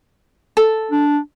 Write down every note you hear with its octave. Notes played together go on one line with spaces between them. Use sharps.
A4
D4